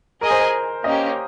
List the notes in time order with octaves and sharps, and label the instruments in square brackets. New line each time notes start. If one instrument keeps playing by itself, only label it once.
[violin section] G#4 D#5 G#5 [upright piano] A#4
[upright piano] C5
A#4
[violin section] A#3 C#4 G4 [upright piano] D#5